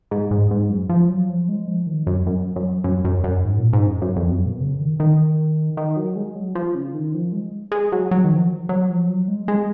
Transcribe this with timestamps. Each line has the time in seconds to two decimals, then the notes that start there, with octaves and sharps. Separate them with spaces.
0.11 G#2
0.31 G#2
0.51 G#2
0.70 F#2
0.89 F3
1.09 F#3
1.29 F3
1.49 G#3
1.68 F3
1.87 D#3
2.07 F#2
2.26 F#2
2.56 F#2
2.84 F#2
3.05 F#2
3.24 F#2
3.44 G#2
3.58 A#2
3.73 G#2
3.87 F#2
4.02 F#2
4.16 F2
4.31 F#2
4.46 B2
4.60 C#3
4.80 D#3
5.00 D#3
5.77 D#3
5.97 F#3
6.16 G#3
6.35 F#3
6.55 F3
6.75 C#3
6.94 D#3
7.14 F3
7.33 G#3
7.72 G#3
7.92 F#3
8.11 F#3
8.24 D#3
8.31 F3
8.69 F#3
8.89 F3
9.09 F#3
9.28 G#3
9.48 G#3